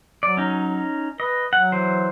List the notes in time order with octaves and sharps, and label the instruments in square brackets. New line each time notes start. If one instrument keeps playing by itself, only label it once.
[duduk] F#3 [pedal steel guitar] D5
[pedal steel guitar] C#4 D#4
[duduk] B4 [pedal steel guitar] D#5
[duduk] F#3 [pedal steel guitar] F#5
[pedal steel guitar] E3 C5